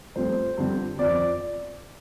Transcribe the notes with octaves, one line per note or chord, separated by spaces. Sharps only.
G2 F3 A3 C4 C5
G2 D3 F3 C4
F2 F3 C4 D5